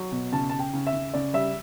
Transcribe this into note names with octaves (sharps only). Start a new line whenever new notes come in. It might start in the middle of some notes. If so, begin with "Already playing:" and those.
Already playing: F#3
B2
C#3 A5
C#3 A5
G5
C#3
E5
C#3
C#3 D5
G3 E5